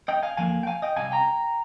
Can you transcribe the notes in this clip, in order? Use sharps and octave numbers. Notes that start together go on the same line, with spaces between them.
D#5 G5
F5 G#5
F2 D3 F3 A#3 F5 G#5
G5
F5 G#5
D#5 G5
C2 C3 G3 F5 G#5
G5 A#5